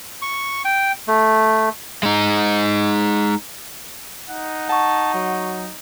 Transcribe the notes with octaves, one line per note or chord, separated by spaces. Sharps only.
C#6
G5
A3
G#3 D#4
D#4 F#5
F#5 A5 C#6
F#3